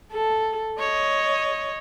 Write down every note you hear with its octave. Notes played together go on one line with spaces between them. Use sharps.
A4
C#5 D#5